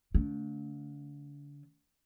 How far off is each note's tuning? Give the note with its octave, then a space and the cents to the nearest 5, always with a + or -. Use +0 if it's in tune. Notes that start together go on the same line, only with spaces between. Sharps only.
D3 -35 A3 +0